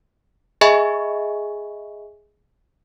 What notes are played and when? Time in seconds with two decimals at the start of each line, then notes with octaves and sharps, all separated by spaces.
0.61 G#4 D#5 E5 G#5 B5 C#6